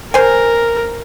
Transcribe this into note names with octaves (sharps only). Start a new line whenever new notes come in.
A#4 C5 G#5